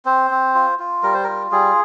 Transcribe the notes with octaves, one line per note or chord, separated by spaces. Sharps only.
C4 C5
C4
F4
F4
G3 A#4
C5
F4 A#4
G3 G#4